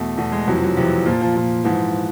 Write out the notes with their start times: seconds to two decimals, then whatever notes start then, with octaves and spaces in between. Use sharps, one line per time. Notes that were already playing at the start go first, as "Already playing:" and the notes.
Already playing: E2 B2 A3
0.18 E2 B2 A3
0.32 G#3
0.47 F2 C3 E3 F#3
0.56 F3
0.64 F#3
0.77 F2 C3 E3
1.06 A#2 F3
1.21 F3
1.36 A#2 F3
1.64 G#2 E3 F3